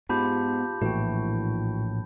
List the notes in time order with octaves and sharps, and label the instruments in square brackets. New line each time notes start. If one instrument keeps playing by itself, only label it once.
[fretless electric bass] G#2 [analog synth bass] B3 [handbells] F4 G4 [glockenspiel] A5 B5 G6
[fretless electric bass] A#1 E3 A3 [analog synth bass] A2 [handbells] F#4 G5